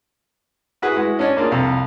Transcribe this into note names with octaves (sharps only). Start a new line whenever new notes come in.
E4 F#4 G#4 B4
G#3 E4 F#4
C#4 D4 C#5 D#5
A#3 D4 F4 G#4
C2 F2